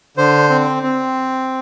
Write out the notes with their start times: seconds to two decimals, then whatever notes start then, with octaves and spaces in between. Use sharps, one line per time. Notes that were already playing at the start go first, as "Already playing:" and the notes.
0.17 D3 C5
0.50 C4
0.83 C4